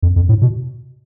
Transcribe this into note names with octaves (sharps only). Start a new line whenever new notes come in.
F2
F2
A2
B2